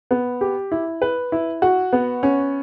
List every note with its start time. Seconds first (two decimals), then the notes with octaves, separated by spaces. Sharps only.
0.11 B3
0.41 G4
0.72 E4
1.02 B4
1.32 E4
1.62 F#4
1.93 B3
2.23 C#4